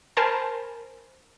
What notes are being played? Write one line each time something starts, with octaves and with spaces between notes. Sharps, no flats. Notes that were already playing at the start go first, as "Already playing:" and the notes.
A#4 C5 G#5 A5 B5